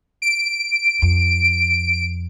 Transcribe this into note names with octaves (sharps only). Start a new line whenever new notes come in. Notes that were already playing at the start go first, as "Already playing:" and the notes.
D7
F2